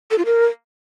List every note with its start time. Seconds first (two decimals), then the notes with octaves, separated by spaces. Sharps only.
0.11 A4
0.18 F4
0.26 A#4